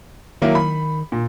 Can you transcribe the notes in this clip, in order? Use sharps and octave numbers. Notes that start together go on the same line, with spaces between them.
D#3 F#3 A#3 E4
B5
A#2